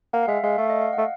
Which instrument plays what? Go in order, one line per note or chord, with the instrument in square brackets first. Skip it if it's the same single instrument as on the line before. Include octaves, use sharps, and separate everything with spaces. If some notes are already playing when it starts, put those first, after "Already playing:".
[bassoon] A#3 [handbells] F#5
[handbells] F5
[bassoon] G#3 [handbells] E5
[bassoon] G#3 [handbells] F5
[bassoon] A3 [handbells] F5
[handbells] D#5
F5
F#5
[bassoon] A3